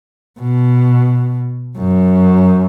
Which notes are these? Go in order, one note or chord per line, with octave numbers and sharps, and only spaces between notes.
B2
F#2